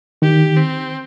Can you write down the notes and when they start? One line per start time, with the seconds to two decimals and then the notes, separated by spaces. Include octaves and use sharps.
0.22 D#3 G4
0.57 C4